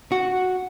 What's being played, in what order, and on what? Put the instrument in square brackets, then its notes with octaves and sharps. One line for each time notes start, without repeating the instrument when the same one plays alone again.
[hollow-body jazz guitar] F#4